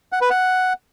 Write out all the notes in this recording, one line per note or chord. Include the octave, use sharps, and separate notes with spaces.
F#5
B4
F#5